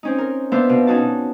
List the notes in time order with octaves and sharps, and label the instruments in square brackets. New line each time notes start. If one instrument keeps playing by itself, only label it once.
[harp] C4 C#4 D#4
A#4
B3 D4 C5 E5 F5
B2
C#4 D#4 F#4 A5